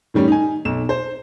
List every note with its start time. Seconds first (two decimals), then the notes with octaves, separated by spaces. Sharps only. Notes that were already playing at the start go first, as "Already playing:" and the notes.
0.14 A2 D#3 G3 C#4
0.28 D#4 G#5
0.65 B1 E7
0.89 C5